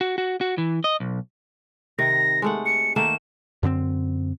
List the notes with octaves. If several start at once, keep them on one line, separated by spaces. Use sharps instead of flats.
F#4
F#4
F#4
E3
D#5
B1
C3 D#3 A#6
G#3 A3 F#5
C#7
D#3 A3 A#3 E7
F#2 D3 B3 C4